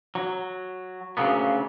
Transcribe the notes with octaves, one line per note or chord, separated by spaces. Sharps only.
F#3
D2 C#3 F#3 A#3 B3